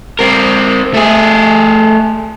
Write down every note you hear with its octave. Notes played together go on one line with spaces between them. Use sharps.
C4 A#4
A3 G#4